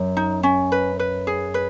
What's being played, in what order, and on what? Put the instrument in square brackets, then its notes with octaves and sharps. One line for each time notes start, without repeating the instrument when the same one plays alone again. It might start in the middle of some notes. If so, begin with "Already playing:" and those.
Already playing: [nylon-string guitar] F#2
[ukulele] D#4
C#4
B4
B4
G#4
B4